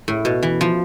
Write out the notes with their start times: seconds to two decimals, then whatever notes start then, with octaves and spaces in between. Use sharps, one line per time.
0.08 A2
0.25 B2
0.43 E3
0.61 F3